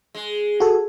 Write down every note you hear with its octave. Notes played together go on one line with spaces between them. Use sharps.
G#3
F#4 A4